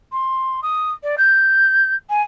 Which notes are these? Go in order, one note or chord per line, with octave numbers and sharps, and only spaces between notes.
C6
D#6
D5
G6
G#5